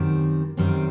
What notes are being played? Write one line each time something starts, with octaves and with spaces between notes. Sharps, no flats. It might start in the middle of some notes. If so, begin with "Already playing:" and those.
Already playing: F#2 D#3 G3 C4
F#2 D#3 G3 C4